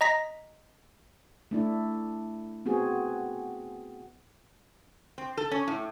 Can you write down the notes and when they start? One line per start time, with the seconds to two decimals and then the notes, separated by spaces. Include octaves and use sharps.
0.01 D#5 A#5 A#6 B6
1.51 A3 D4 E4
2.66 B3 C4 F#4 G#4
5.18 C4
5.37 A4
5.51 C#4
5.68 A2